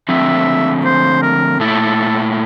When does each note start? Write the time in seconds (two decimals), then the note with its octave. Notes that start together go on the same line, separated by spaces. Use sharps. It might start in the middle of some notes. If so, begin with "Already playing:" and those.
0.09 D3 F3 A3 C4 E5
0.85 C5
1.22 A#4
1.60 A#2 A3 E4 A4